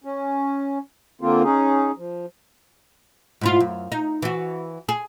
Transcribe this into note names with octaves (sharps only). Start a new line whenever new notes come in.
C#4
D3 A#3 C4 F4
C#4 D#4 G#4
F3
G#2 E4 F4
F#2
D#4
E3 F#4
G#4